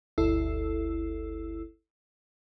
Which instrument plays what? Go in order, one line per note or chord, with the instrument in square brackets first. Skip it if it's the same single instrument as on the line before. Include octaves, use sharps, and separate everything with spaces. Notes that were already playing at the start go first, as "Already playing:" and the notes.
[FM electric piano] G1 D2 E4 A4 E6 C7